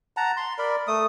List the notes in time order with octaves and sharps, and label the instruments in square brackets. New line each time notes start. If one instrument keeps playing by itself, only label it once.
[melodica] F#5 A5 A#5
C6
A#4 D5 B5
A3 D#6